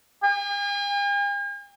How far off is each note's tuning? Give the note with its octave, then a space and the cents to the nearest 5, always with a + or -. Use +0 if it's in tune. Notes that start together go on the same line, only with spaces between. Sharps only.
G#5 -45